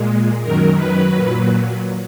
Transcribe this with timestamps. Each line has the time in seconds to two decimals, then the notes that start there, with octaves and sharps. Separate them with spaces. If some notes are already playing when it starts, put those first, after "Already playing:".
Already playing: A#2 G#3
0.43 F#2 D#3 F#3 A#4
0.76 B4
1.11 A#2 F#3